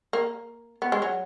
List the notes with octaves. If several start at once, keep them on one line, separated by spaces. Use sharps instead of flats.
A#3
B3
G#3
F#3